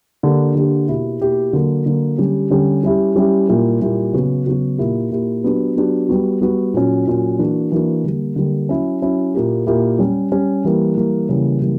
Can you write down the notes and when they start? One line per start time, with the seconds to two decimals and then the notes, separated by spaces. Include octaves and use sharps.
0.23 D3 A#3 D4 G4
0.55 D3 A#3 D4 G4
0.88 B2 A#3 E4 G4
1.20 B2 A#3 E4 G4
1.53 D3 F#3 A#3
1.86 D3 F#3 A#3
2.18 D3 G3 C#4 G4
2.50 D3 G3 C#4 G4
2.83 G3 C#4 E4 G4
3.16 G3 C#4 E4 G4
3.48 A#2 G3 A#3 E4 G4
3.81 A#2 G3 A#3 E4 G4
4.13 C#3 F#3 B3 F#4
4.46 C#3 F#3 B3 F#4
4.78 A#2 A#3 E4 G4
5.11 A#2 A#3 E4 G4
5.44 F#3 B3 D4 G4
5.76 F#3 B3 D4 G4
6.09 G3 B3 F#4
6.41 G3 B3 F#4
6.74 A#2 F#3 C#4
7.07 A#2 F#3 C#4
7.39 E3 A#3 D4 F#4
7.72 E3 A#3 D4 F#4
8.04 D3 G3 A#3
8.36 D3 G3 A#3
8.69 F#3 C#4 E4
9.02 F#3 C#4 E4
9.34 A#2 A#3 E4 G4
9.67 A#2 A#3 E4 G4
9.99 G3 C#4 G4
10.32 G3 C#4 G4
10.64 E3 G3 A#3
10.97 E3 G3 A#3
11.29 C#3 E3 G3 A#3
11.62 C#3 E3 G3 A#3